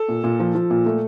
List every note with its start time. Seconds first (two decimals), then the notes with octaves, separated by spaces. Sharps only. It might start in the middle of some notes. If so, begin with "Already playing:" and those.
Already playing: A4
0.08 A#2
0.24 A#2
0.40 F3
0.55 F3
0.70 A#2
0.86 A3